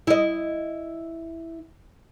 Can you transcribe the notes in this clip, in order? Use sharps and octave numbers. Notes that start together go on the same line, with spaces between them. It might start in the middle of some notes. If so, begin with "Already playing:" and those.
E4 D#5